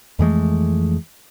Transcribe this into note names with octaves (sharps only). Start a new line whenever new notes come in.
F2 E3 G#3 A3